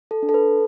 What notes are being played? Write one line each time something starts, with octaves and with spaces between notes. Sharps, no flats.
A4
D4
A4
B4